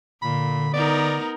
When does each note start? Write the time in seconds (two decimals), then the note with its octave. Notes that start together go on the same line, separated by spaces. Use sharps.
0.22 A#2 D3 B5
0.74 B3 D#4 A#4 D5